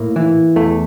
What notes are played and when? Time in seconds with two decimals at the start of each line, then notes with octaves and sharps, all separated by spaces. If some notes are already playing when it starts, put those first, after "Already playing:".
Already playing: A2 A#3
0.16 E3
0.56 E2 A3